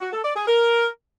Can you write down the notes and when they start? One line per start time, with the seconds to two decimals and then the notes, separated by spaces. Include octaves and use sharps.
0.01 F#4
0.12 A4
0.24 D5
0.36 G#4
0.48 A#4